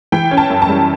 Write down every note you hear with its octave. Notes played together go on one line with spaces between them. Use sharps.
E3 G5
C#4
A5
F#2
A5
G3